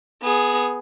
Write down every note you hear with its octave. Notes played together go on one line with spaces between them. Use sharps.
B3 G#4